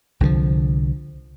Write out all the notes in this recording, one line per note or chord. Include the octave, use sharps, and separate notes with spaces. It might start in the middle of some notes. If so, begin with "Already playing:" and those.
C2 D3 D#3 F3